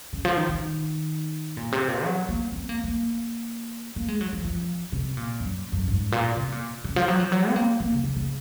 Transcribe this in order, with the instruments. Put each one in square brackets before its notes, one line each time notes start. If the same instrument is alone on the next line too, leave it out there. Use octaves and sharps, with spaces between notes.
[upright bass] C#3
F3
D#3
D#3
A#2
C3
A#2
F#3
A#3
C4
A#3
A#3
A#3
G#3
F#3
F3
F3
C3
A#2
F#2
F#2
G#2
A#2
C3
A#2
C#3
F3
F#3
F3
F#3
C4
A#3
A#3
C#3
C#3
C#3